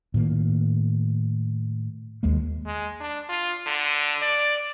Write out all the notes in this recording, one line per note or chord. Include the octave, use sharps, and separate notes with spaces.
A2 D#3 A#3
D#2 G#3 A#3
G#3
D4
F4
D3
D5